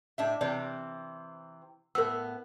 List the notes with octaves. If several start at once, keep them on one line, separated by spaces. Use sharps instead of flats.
A2 D4 E5
C3 E3 C4 D5
A2 B3 A#4 E6